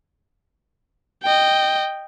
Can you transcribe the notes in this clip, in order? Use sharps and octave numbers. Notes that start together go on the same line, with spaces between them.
D#5 G5